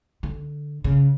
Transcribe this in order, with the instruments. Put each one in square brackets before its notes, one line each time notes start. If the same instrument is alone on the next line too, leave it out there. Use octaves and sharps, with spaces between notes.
[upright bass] D3
C#3